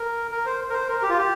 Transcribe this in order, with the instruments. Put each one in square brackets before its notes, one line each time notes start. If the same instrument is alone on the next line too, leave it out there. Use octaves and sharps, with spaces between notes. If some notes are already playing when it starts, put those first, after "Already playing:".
Already playing: [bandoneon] A#4
A#4
C5
A#4
C5
A#4
G4
F4
G4